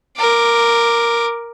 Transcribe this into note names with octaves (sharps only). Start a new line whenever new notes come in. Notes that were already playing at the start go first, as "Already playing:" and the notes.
A#4 D6